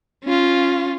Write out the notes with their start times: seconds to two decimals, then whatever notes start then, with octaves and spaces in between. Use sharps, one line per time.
0.24 C#4 F4